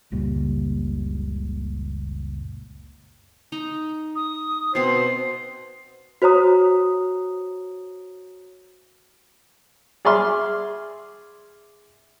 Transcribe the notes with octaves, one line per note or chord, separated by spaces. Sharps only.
F#1 C#2 A#2 G3
D#4 D#5 A#5
D#6
B2 C4 C5 C7
F#4 C5 C#5 A#5 D#6
G#4 D5 E5 C6 F6